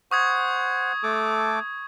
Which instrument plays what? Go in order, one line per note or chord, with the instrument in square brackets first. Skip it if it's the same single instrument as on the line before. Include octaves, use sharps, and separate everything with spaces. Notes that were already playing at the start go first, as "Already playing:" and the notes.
[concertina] C5 F#5 [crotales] C#6 D#6 G#6
[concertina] A3 A4 D6